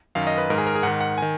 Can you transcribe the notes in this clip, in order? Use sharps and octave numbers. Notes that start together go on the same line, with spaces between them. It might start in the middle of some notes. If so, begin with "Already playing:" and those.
F#2 D#3 F5
D#5
B4
G#2 D#3 A#4
G#4
A#4
G#4
G#2 D#3 F#5
F#5
D#3 G#5